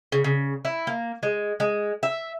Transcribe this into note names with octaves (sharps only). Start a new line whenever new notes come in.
C#3
C#3
E4
A#3
G#3
G#3
E5